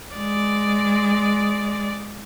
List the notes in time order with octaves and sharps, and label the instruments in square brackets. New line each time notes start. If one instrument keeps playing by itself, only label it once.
[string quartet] G#3 D5